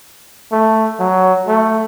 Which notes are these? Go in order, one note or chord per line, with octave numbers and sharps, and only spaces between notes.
A3
F#3
A3